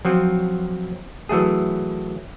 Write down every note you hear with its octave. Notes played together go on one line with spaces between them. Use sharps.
F3 F#3 C4
E3 F#3 A3 G#4